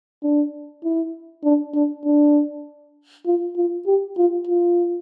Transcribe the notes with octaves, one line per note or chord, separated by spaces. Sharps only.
D4
E4
D4
D4
D4
F4
F4
G4
F4
F4